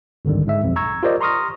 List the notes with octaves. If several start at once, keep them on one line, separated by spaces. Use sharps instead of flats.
G#1 C#2 G2 D3 D#3 G3
G#2 G#3 E5
B1 F2
A#5 C#6 E6 G#6
F4 G4 A#4 C5 D5 D#5
A#5 C6 C#6 D#6 F6 A#6